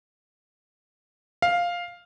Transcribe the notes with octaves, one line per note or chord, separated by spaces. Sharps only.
F5